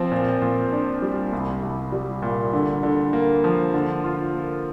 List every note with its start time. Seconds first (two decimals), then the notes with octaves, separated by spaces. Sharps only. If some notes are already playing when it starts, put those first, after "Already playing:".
Already playing: F3 C4
0.12 A#2
0.42 A#2
0.72 D4
1.02 G3
1.33 C2
1.63 C2
1.92 G3
2.22 A#2
2.53 D3
2.83 D3
3.13 A#3
3.44 F3
3.74 D3
4.04 F4
4.34 A#3